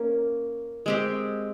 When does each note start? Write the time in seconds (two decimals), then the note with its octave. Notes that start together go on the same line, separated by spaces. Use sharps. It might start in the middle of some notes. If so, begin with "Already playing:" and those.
Already playing: A#3 C#4
0.86 G#3 C4 G4